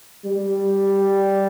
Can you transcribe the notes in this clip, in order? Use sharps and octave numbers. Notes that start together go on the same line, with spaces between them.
G3